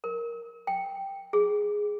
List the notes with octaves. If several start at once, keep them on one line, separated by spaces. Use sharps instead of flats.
A#4
G5
G#4